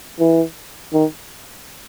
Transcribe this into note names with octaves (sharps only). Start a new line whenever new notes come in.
E3
D#3